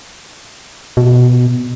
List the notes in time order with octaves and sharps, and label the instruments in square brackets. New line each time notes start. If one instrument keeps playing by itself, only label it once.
[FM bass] B2